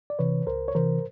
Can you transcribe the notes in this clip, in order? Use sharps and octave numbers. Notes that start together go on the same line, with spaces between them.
D5
C3 E3 B4 C#5
C#2 A#4 C5
C#5
C3 E3 A#4 C5